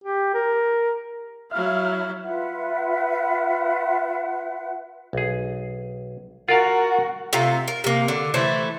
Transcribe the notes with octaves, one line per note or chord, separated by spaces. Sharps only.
G4
A#4
F#3 E4 E5 F5 F6
F4 B4 E5 F#5
B1 G#4
F4 F#4 A#4 D5 F5
C3 A3 F4 A#5
A#4
C3 A#3
D3
E3 A3 C5 E5